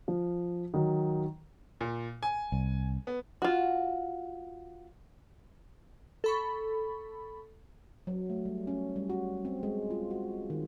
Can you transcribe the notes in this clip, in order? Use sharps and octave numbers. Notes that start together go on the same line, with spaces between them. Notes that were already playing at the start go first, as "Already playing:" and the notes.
F3
D#3 F#3
A#2
G#5
C2
B3
F4 F#4
A4 B5 C#6
F#3
A3
G3
C#4
G3
F#4
C4
G#3
F4
F#4
D#3